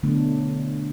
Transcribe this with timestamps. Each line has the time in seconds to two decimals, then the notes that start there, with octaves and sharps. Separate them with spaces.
0.03 B2 D3 F#3 A3 D4